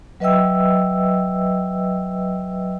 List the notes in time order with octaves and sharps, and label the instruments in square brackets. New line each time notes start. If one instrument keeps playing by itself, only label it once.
[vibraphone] F#3 B4 D#5 E5 G5 E6